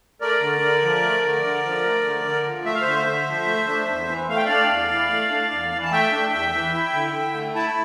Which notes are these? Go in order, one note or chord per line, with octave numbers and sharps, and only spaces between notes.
A3 A#4 D5
D3
D3
F3
A3
D3
D3
F3
A3
D3
D3
F3
A3 E5
F5
D3 C5 E5
D3
F3
A3
D4
E2
E3
A3 F5
G5
D4 D5 F5
E2
E3
A3
D4
E2
E3
A5
A3 E5 G5
D4
E2
E3
E4
D3
D3
A3
E4 A5